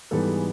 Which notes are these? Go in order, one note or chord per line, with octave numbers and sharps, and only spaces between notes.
G#2 E3 G3 B3 A4
G#4